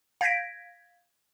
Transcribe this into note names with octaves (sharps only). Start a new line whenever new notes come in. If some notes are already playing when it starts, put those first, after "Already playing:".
F5 G6 G#6 A#6 B6 D7